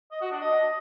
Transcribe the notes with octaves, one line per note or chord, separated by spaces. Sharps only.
D#5
F#4
D4
D#5